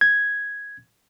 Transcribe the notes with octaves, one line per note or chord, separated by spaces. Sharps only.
G#6